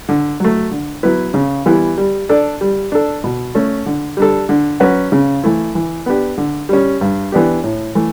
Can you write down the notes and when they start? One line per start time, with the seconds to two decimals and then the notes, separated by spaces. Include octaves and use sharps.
0.09 D3
0.40 F#3 A3
0.71 D3
1.03 F#3 B3 E4 B4
1.34 C#3
1.66 E3 G3 B3 E4
1.98 G3
2.29 D4 A4 D5
2.61 G3
2.92 D4 A4
3.24 B2
3.55 A3 C#4
3.86 D3
4.17 G3 D4 A4
4.49 D3
4.80 F#3 C#4 F#4 B4
5.12 C#3
5.43 E3 A3 E4
5.75 E3
6.06 B3 D4 G4
6.38 D3
6.69 G3 C#4
7.01 G2
7.32 E3 B3 D4 G4
7.63 A2
7.95 E3 A3